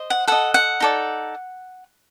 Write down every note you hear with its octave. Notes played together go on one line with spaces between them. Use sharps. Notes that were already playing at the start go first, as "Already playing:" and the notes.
Already playing: C5 D#5
F#5
A4 D#5 F#5
F#5
D#4 A4 D5